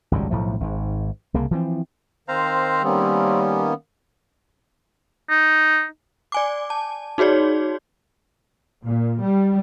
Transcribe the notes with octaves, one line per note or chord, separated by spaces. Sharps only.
G#1 C#2 F#2 G3
B1 A2 F3 A3
G#1 G#2
C2 C#3 A#3
E3 F3 C4
D#3 C4 C5 F5 A#5
D#3 G3 A#3 B3 C#4
D#4
D5 G#5 D6
A5
D#4 F#4 G#4 C#5 D5
A#2
G3